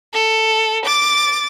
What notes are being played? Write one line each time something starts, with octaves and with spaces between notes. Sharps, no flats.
A4
D6 A6